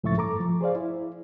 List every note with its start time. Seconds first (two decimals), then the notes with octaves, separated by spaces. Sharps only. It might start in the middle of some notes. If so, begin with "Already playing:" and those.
0.04 C#2 A2 F3 E5 C#6 A6
0.17 G2 A4 A#5 D6
0.40 F3
0.61 G#4 C5 D5 F5
0.75 E4